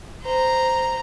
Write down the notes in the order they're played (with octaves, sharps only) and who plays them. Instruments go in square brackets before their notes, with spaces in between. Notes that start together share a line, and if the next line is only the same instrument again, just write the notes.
[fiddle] C5 A#5